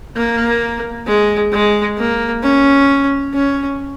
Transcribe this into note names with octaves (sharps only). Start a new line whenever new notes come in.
A#3
G#3
G#3
A#3
C#4
C#4